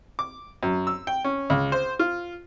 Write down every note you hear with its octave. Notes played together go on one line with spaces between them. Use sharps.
D6
F#2
E6
G5
C#4
C#2
C5
F4